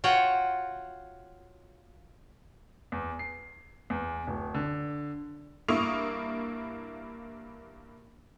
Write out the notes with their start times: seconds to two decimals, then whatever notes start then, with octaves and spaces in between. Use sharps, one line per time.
0.04 F4 F#4 C#5 F#5 G5
2.92 E2
3.19 C7
3.90 E2
4.27 D1
4.54 D3
5.68 G2 A#3 E4 C#6 D#6 F7